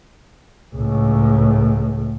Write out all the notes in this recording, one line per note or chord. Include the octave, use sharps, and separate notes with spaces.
C#2 A2